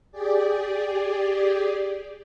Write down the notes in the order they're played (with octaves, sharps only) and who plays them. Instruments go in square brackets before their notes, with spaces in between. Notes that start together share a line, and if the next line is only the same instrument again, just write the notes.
[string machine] G4 G#4 D5